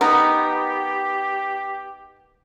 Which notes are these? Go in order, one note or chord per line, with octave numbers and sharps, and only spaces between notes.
B3 D#4 G4 A#4